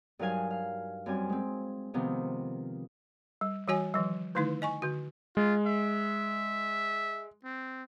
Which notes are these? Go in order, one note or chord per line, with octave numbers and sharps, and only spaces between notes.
G2 F#3 D#4 A#4 F5 G#5
F5
F#2 G3 C4 G#5
G#3 C4
C3 D#3 F3 B3 C4
G3
E3 G3 F#4 C#5 G#5
D#3 F3 G3
D3 D#3 A3 D#4 E4 B4
D#5 G#5 C#6
D3 F#4
G#3 F4
E5
C4